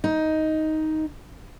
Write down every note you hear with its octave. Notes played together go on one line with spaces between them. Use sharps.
D#4